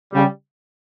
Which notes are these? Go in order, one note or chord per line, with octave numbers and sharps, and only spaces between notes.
C#3 G3